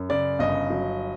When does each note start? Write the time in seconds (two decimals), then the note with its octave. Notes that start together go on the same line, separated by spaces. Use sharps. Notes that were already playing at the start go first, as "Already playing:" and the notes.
Already playing: F#2
0.09 C#3 D5
0.39 G1 D#5
0.70 F#3